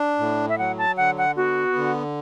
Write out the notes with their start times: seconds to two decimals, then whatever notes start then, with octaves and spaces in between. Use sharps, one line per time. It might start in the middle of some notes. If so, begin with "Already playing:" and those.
Already playing: D4
0.19 A2
0.49 E5
0.58 F#3 F#5
0.78 A5
0.97 D3 F#5
1.18 F#5
1.36 B3 F#4
1.76 D3